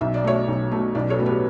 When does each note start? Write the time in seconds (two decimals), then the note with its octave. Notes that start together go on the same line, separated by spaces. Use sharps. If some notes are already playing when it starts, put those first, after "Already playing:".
0.01 B1 E5
0.14 D5
0.24 B2 A3 C#5 E5
0.48 B1
0.71 B2 A3
0.95 B1 B4 D5
1.10 A4 C#5
1.18 A2 F#3 B3
1.26 G4 B4